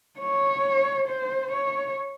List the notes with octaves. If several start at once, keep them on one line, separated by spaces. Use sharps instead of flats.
C#5
C5
C#5